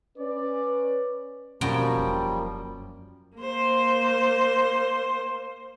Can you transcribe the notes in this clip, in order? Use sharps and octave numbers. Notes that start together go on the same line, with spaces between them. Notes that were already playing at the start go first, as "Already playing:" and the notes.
C#4 B4 D5
F#2 B2 F3 G3 A#3 F#4 G5
E1
A#3 C5